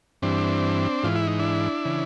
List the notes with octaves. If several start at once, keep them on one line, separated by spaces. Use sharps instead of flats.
G2 E3 C4 D4
G#2 E3 F4
E4
D#4
D4 E4
C#3 E3